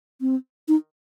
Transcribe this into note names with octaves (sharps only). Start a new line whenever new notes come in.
C4
D#4